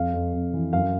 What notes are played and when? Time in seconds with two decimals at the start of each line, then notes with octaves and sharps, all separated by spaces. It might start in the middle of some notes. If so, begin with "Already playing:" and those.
Already playing: F2 F5
0.14 F2
0.33 F2
0.53 E3
0.73 F#2 F5